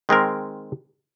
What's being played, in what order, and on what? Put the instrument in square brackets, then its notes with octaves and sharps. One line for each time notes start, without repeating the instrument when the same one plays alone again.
[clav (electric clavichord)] D#3 G#3 C4 A#4